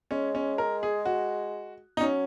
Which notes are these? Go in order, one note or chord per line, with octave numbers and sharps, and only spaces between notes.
G#3 C#4
C#4
A#4
G#4
F#4
D#4
F#3 C#4